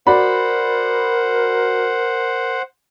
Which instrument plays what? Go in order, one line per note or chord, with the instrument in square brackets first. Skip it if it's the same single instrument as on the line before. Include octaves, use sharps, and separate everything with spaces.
[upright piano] F#4 D5 B5 [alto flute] A#4 [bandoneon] C5 F#5